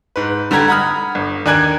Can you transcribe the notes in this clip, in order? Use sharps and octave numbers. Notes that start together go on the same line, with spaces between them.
G#2 B4
D3 G3 G4 A#5 G#6
F#5 A#5 B5 D#6 F6
G1
D#2 D4 A#4 G#5 F#6 G#6